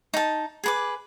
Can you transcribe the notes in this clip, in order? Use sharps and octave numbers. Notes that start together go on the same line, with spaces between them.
D#4 A5
G#4 B4 D6